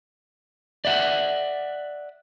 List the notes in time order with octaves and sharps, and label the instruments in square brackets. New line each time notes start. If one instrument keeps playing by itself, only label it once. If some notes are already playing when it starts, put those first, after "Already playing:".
[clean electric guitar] D5 E5 F#5